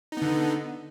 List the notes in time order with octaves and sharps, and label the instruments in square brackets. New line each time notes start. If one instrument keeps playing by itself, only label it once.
[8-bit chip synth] D#4
B3
D3